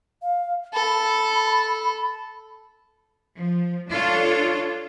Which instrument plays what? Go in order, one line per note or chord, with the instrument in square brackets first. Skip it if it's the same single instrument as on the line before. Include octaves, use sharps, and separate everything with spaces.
[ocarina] F5
[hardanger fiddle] A4 [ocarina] B5
[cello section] F3
D4 F4 A4 C#5